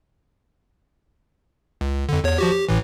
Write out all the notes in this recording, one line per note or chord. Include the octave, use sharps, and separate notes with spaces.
C#2
F2 D3
E2 C#5
F3 F#4 G4
G4
A1 A2 E3